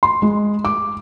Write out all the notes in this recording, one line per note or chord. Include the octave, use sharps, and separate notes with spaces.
C6
G#3
D6